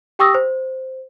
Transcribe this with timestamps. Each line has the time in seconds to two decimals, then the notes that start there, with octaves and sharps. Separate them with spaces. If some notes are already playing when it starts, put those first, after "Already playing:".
0.19 G4 G5 C#6 D#6 E6 A#6
0.35 C5